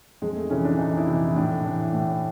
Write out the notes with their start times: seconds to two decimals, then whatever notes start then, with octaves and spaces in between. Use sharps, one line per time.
0.22 F2 G#3
0.36 A3
0.50 C3 E3 C#4
0.64 D4
0.79 F2 D#4
0.98 E4
1.08 C3 E3
1.36 A2 D4
1.64 E3
1.93 A2